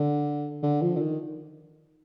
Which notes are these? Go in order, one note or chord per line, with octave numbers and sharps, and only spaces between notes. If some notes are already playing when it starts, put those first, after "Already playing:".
Already playing: D3
D3
F3
D3
D#3